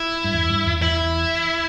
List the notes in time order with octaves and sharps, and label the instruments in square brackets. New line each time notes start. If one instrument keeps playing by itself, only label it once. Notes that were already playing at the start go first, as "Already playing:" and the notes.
Already playing: [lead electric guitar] E4
[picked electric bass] G2
E2
G2
E2
[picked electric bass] E2 [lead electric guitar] E4